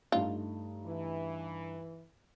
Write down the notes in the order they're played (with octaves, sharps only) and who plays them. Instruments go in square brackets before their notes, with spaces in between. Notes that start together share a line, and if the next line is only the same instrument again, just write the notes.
[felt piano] G2 A3 D#4 [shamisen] F4
[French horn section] E3